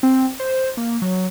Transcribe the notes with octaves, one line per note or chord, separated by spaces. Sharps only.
C4
C5
A#3
F#3